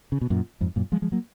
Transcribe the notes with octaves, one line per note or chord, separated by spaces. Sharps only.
C#3
B2
F#2 A#2
F2 G#2
F#2 A#2
F3 G#3
F3 G#3
F#3 A#3